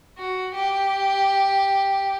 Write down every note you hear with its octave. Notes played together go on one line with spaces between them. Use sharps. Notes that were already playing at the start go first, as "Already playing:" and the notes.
F#4
G4